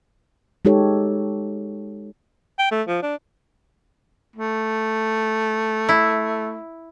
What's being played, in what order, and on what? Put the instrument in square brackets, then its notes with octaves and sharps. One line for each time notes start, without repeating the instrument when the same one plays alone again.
[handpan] G#3 D#4 G4 A4 C#5
[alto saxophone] G5
A3
F3
D4
[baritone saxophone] A3
[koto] E4